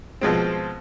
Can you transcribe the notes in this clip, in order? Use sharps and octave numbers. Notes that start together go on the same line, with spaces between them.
B2 F3 G#3 C4